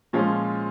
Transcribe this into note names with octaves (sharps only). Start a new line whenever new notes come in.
A#2 F3 G#3 C#4 F4